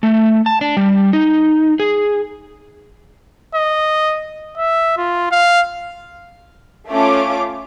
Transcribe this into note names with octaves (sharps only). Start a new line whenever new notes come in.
A3
A5
D4
G3
D#4
G#4
D#5
E5
F4
F5
A3 C#4 F4 D6